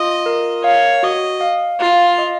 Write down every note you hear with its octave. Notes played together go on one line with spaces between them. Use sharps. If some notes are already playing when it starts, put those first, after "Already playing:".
Already playing: F4 D#5
A#4
C#5 F5
F#4 D#5
F5
F4 F5
D#5